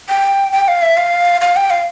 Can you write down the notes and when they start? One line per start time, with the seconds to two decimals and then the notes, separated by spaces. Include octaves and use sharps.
0.09 G5
0.52 G5
0.68 F5
0.82 E5
0.97 F5
1.41 F5
1.56 G5
1.70 F5